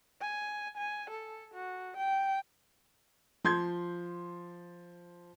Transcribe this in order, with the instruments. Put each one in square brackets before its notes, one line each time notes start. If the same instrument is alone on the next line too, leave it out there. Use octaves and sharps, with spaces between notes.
[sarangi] G#5
G#5
A4
F#4
G5
[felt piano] F3 C6 G6 G#6